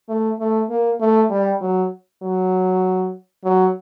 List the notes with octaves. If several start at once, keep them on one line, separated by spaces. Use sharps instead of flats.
A3
A3
A#3
A3
G3
F#3
F#3
F#3